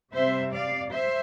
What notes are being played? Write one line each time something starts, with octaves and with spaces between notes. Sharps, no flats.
C3 G3 C4 C5 E5
D5 F5
C5 E5